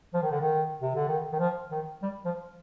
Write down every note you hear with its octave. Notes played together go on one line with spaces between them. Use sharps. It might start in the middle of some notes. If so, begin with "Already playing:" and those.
F3
D#3
D3
D#3
C3
D3
D#3
D#3
F3
D#3
G3
F3